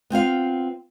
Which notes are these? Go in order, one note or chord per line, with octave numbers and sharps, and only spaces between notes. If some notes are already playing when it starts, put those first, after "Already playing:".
B3 C4 F4 F5